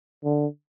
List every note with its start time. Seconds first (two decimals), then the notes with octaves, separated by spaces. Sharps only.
0.24 D3